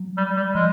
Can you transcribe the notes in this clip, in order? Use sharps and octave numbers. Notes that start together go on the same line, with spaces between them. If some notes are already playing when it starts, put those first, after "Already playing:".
Already playing: F#3
G3
G3
F3 G#3